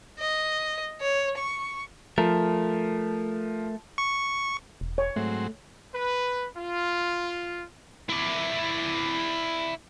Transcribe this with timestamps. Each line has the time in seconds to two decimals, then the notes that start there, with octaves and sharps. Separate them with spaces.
0.19 D#5
1.01 C#5
1.38 C#6
2.18 F3 A3 A#4
3.98 C#6
4.81 E1
4.98 C#5
5.16 G#2 F#3 A3 C4
5.93 B4
6.57 F4
8.10 E4 D5